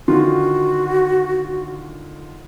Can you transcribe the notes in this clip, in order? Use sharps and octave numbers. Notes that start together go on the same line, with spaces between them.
D3 D#3 F4 F#4